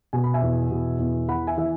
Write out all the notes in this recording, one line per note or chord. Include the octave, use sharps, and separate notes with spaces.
B2 G#5
B5
E5 G#5
E2
B2
E2
E3 F#5 B5
E5 G#5
E3 E5